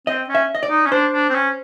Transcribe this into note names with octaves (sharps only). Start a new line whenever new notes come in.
C4 D#5
C#4
E5
D#5
D5
D#4
C#4
D4 C5
D4
C4
C#4